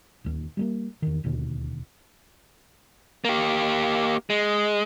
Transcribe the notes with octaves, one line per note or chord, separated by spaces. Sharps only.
D1 D#2
G3 G#3 A#3
E2 D#3
D1 D#2 B2 D3
A#3 G4
G#3